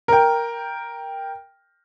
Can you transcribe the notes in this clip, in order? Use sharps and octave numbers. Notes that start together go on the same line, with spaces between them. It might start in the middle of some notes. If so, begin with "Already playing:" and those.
A#4 G5